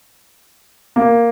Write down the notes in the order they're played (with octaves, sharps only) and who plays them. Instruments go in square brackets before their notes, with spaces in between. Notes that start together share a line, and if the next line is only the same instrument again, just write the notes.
[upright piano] A#3